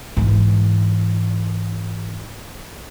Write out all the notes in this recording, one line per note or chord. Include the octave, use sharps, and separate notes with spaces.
G#2 E3